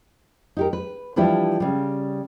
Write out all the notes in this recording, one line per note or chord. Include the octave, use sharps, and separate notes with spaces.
D#4 G4 A#4
B4
E3 F3 G3 D4 E4 G4
C#3 G3